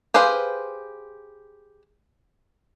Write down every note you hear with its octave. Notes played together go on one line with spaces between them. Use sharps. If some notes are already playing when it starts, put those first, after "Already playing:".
G4 G#4 B4 C5 F5